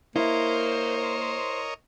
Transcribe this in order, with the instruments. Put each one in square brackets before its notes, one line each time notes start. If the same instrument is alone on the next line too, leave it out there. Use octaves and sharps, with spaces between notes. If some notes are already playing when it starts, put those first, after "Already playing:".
[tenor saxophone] A#3 [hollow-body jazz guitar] E4 [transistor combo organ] A#4 C#5 D#5 [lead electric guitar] C5